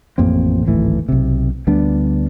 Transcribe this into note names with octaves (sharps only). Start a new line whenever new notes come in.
A1 F2 A#3 C4
D1 G#1 E3 A3
B1 C3
D2 G3 B3 D4